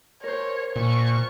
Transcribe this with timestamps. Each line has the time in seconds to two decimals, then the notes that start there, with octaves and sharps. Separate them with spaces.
0.23 A#4 C5 C#5
0.76 A#2 C#6